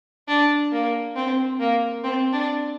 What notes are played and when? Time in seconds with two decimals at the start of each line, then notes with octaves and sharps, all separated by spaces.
0.28 D4
0.72 A#3
1.16 C4
1.60 A#3
2.04 C4
2.33 D4